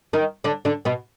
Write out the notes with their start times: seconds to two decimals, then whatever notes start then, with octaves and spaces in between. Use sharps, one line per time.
0.13 D#3 D#4
0.44 D3 D4
0.65 D3 D4
0.85 B2 B3